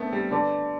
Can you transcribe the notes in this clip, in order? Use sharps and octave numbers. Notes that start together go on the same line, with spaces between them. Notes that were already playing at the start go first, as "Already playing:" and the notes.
Already playing: A3 B3 C4 D4
G3
D3 B4 D5 A5 D6